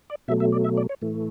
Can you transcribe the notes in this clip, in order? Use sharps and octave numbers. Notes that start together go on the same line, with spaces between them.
D5
B2 F#3 A3 E5
E5
D5
E5
D5
C#5
A2 E3 A3